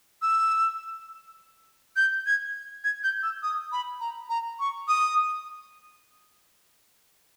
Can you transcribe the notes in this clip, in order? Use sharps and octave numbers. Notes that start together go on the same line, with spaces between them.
E6
G6
G#6
G#6
G6
E6
D#6
B5
A#5
A#5
C#6
D#6